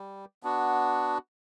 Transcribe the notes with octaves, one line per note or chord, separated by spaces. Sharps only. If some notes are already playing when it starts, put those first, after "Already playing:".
Already playing: G3
B3 D4 F#4